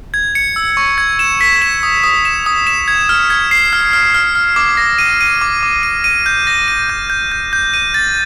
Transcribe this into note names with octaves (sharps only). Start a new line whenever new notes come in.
G#6
C#7
E6
C#6
G#6
E7
B6
E7
D#6
D#6
E7
D#6
E7
G#6
F6
G#6
C7
F6
F6
F6
F6
D6
A#6
D#7
D#7
D6
D6
D#7
D#7
G6
A#6
D#7
G6
G6
G6
G6
D#7
A6